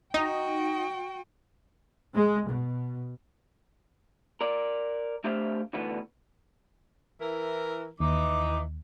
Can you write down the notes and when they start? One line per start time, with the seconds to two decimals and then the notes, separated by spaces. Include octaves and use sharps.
0.14 D#4 F#4 D#5 G5
2.13 G#3
2.48 B2
4.41 A#4 D5
5.24 A3 D4 G4 C5 E5 F5
5.73 D2 B2 D3 E3 B3
7.21 E3 E4 A#4
8.00 D#2 E3 D#4 D6